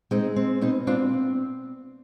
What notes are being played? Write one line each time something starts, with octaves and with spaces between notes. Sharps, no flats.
G#3 C4 D#4
C4
B2 C4 D#4
C4 D4 F4